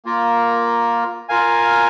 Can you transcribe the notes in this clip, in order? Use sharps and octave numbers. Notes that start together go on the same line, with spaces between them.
A#3 F4 A#4
F4 A#4 F5 G#5